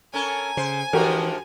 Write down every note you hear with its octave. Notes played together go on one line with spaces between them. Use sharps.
C#4 A4 A#4 G#5
C#3 C5
G#2 D3 E3 F3 F#4 G4 A#4